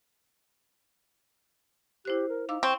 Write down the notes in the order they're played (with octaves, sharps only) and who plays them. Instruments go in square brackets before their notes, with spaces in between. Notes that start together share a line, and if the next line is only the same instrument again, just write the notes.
[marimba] E4 C5 F#6 [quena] G4
[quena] A#4
[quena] D#4 [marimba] F5 D6 E6
[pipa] C4 [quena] C#6